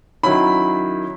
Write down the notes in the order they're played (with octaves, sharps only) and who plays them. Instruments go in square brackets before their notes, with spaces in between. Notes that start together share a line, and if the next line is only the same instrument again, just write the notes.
[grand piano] D#3 F#3 C#4 E4 B5